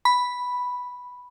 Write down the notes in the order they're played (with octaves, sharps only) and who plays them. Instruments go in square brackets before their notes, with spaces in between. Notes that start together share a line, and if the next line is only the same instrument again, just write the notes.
[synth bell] B5